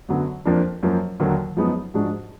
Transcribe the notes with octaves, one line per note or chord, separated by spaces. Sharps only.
F#2 D3 F#3 B3
F2 F3 A#3 D4
F#2 F3 A#3
D#2 D3 F#3 A#3
F#2 F3 G#3 B3 D#4
G#2 F3 G#3 D4 F#4